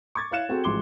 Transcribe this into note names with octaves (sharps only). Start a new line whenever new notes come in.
C#6 D6 G#6 A6
E4 C#5 F5 F#6 C#7 E7
C4 F#4 G#4 A4 G5
A1 F3 G#3 C6 D6 G7